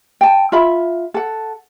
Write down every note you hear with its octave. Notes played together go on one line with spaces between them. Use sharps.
G5 A5
F4 E5 B5
A4 F#5